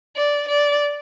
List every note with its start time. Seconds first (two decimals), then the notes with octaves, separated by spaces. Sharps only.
0.16 D5
0.48 D5